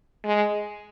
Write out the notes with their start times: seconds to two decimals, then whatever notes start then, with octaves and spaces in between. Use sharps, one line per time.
0.25 G#3